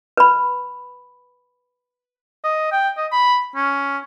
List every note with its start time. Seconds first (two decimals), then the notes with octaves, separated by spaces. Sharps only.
0.17 B4 B5
2.44 D#5
2.72 G5
2.98 D#5
3.12 B5
3.56 C#4